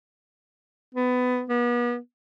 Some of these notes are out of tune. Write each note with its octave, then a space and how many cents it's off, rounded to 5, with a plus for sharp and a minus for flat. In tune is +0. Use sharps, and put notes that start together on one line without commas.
B3 +20
B3 -40